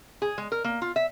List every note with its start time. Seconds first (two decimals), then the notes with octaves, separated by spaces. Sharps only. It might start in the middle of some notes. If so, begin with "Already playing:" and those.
0.22 G#4
0.38 G#3
0.52 A#4
0.64 A#3
0.82 F4
0.96 E5